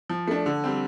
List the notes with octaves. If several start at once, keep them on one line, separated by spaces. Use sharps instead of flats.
F3
A3 D4
D3
G3 C4